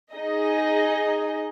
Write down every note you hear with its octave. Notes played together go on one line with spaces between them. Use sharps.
D#4 G#4 D#5